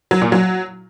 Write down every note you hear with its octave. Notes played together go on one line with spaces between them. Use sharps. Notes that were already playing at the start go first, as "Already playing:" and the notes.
F#3
A#2
F#3